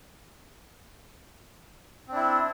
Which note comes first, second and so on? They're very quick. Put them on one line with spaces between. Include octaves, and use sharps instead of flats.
C4 D4 E4